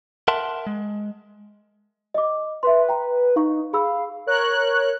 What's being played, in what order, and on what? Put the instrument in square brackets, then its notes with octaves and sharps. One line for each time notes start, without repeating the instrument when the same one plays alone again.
[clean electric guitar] A#4 E5 F#5 A5 C6
G#3
[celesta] D#5 D6
[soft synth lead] B4 [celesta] E5 C6
[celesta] G5 A#5
[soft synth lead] D#4 [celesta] F5 C#6
[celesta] G#4 B5 E6 [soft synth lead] F5
[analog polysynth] A#4 C#5 F#6